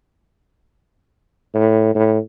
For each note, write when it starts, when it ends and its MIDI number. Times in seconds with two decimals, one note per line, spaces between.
1.55 1.93 45
1.95 2.19 45